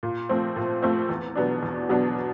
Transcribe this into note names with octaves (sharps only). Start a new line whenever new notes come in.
A#2
F3 A3 C4
A#2
F3 A3 C4
E2
B2 F#3 B3 D4
E2
B2 F#3 B3 D4